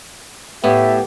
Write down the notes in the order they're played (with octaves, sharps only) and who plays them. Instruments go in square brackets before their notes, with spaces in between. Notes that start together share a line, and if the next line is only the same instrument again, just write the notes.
[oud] A2 [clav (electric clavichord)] B3 [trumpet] G4 [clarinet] E5